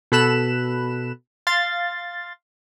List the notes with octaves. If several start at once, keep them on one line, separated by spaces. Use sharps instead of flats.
B2 A4 B5 F#6 E7
F5 C6 A6